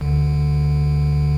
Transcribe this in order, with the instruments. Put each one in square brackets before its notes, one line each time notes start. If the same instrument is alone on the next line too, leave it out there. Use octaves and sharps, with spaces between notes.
[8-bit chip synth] D2 D3